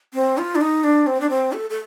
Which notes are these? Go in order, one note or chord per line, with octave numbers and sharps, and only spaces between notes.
C4
F4
D4
D#4
D4
C4
D4
C4
A4
A4